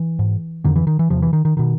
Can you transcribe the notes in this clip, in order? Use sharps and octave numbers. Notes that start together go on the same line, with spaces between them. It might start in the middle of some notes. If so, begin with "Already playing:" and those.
Already playing: E3
G#2
F2 D3 D#3
E3
D#3
E3
E2 C3 F3
E3
D#3
D#3
B2 D#3